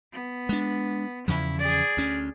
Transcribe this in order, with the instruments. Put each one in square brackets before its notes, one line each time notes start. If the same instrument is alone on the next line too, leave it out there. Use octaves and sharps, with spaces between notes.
[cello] B3
[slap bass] G#3 D4
[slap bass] E2 C#3 F3 [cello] E4
[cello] G#4 D5
[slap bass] D2 C#4